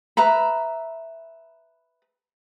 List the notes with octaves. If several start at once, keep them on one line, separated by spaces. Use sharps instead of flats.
B4 E5 A#5 B5